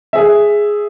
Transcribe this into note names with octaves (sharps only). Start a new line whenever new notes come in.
G#4 E5